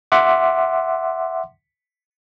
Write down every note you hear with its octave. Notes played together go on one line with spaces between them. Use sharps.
E5 F#5 C6 D6